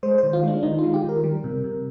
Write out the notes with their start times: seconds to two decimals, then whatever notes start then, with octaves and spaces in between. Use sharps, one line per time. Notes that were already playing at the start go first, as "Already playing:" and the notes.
0.03 G#3 C5
0.18 C5
0.23 D#3
0.33 F4
0.43 G#3 D4
0.63 D#3 D#4
0.79 G#3 F4
0.94 G4
1.04 D#3 A#4
1.24 G3
1.44 C3
1.64 C3